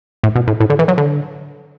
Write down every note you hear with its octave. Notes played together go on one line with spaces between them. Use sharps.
A2
B2
A2
A2
D3
E3
F#3
D3